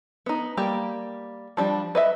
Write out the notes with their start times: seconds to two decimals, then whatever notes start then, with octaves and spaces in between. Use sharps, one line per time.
0.26 B3 D#4
0.57 G3 A#3 G4
1.57 F3 G3 D4
1.95 B4 D#5 E5